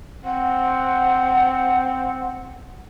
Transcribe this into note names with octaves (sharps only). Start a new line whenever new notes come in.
C4 F#5